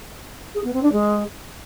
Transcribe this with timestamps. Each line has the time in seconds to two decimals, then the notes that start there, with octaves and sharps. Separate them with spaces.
0.54 G#4
0.64 B3
0.73 C4
0.83 D4
0.92 G#3